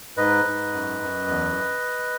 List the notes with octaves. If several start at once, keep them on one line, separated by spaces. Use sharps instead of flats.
G#2 B4 D#5
G#2
F#2
F#2
E2